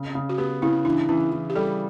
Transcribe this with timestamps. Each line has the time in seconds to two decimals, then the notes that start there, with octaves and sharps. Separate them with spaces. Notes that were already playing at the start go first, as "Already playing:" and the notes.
Already playing: C#3
0.15 C#3
0.29 F#4
0.38 B3 G4
0.62 C#3 E4
0.85 E3 D4
1.09 E3 C#4
1.32 E3
1.50 G4
1.55 G3 A4